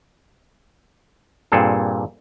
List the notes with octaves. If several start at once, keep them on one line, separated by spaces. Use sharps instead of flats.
G2 A#2 C4 G#4 A4